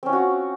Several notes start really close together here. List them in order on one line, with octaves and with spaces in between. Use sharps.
C4 C#4 F4 F#4